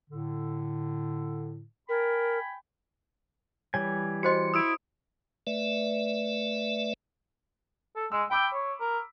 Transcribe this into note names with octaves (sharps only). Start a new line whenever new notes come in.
A2 D3
A#4 G5 G#5 B5
E3 G3 C#5 G#5
F#4 C5 D#5 C6 C#7
E4 D#6 E6 D7
A3 B4 D5 E5
A4
G#3 E6
G5 B5 D6 E6
C#5
A#4